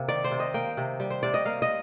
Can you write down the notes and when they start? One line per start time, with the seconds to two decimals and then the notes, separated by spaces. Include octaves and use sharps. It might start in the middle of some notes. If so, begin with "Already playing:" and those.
Already playing: C3 A#3 F5
0.08 D#3 D5
0.24 C5
0.31 C3
0.40 D#5
0.54 A#3 G5
0.77 C3
1.00 G3
1.10 C5
1.23 C3 D5
1.34 D#5
1.45 A#3 F5
1.62 D#5